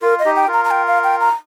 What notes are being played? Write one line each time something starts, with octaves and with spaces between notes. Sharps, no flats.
F4 A#4
D#5
D#4 G4
G5
F4 A#4
A#5
A#5
G5
F5
G5
A#5